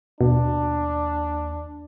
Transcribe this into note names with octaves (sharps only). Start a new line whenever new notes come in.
D#2 B2 D4